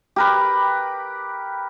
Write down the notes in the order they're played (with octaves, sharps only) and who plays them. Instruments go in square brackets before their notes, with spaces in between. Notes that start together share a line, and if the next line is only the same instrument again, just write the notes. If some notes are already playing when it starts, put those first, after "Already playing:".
[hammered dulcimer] G4 A#4 B4